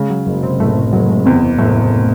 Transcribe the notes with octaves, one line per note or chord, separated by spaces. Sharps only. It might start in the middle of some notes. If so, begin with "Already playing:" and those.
Already playing: C#3 G#3
F#3
F#1
C3 C4
F#1 A2 A3
F#1 F#3
G#3
E2 C3 C4
F#1 A2 A3